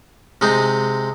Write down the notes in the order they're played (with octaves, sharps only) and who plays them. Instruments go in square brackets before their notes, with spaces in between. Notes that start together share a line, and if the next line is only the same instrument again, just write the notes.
[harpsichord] C3 G#3 C4 D#4